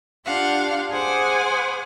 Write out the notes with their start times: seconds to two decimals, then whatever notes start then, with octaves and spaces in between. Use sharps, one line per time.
0.24 D4 F4 G4 F5 F#5
0.91 G#4 C5 F#5 G#5 D6